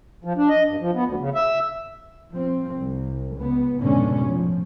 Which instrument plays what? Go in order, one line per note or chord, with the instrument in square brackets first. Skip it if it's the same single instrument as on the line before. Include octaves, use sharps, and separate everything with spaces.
[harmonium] F3
D4
D#5
G2
F3
B3
D2
C#3
E5
[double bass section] F3 C4
C2
C#2 B3
F1 G#2 B2 D3 G#3 C#4
A2 F3